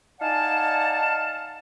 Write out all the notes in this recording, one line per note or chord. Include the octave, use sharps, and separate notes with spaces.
D#4 D5 F5 F#5 G#5 A5